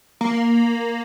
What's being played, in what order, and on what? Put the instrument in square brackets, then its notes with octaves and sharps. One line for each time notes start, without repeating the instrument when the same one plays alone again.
[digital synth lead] A#3